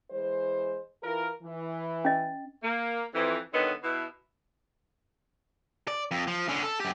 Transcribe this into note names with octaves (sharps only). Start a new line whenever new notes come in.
E3 G#3 C5
E3 F4 A#4
E3
C#4 D#5
A#3
F2 E3
D3 D#3 F#3 B3 C#5 D#5
B2 E4
D5
F2
F3
D3 C#4
A4
F#2 G4